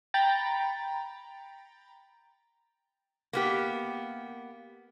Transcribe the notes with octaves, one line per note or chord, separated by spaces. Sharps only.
G5 A#5 B5 A6 C#7
A#3 B3 G4